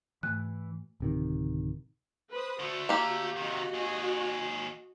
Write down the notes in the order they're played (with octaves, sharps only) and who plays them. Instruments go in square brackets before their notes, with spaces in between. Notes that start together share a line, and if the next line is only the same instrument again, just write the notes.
[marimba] G#2 A3 F#6 [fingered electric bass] E3
[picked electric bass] D1 C3 D#3
[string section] B4 C5 D#6
[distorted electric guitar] D3 A3 [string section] F#4
[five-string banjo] A#3 G4
[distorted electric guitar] C3 D#3 [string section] F#4 D#5
[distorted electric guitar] D#2 G#4